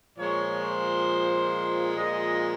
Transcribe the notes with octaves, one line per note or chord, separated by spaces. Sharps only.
A#2 F3 G#3 C#5
C5
A#2 F3 G#3 D#5